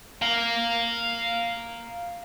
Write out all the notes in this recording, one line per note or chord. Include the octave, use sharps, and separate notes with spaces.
F5 A#5